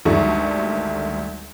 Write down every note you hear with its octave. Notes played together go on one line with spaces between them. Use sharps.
G#1 D2 D#3 G3 A3 C#6